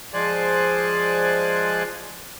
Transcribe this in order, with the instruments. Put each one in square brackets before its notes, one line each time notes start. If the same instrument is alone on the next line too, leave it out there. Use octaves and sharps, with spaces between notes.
[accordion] F3 G#3 C5 D5 G#5 F#6